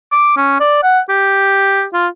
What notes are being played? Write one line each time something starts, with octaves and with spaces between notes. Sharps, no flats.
D6
C#4
D5
F#5
G4
F4